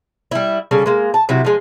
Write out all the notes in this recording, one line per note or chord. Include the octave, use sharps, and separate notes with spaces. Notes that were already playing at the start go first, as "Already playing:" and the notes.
G3 E4
C#3 G3 A4
G#3 A#3
A5
C3 F#3 E4
F3 G#3